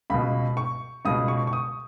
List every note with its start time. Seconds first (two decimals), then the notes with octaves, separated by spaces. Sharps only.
0.10 C#2 B2 B5
0.57 C#6
1.05 C#2 B2 D#6
1.28 C#6
1.47 C#6
1.53 D#6